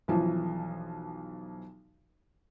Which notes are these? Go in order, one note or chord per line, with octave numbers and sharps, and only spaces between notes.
B1 E3 F3